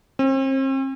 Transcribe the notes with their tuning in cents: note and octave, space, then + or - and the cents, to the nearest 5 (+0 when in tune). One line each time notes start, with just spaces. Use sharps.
C4 +40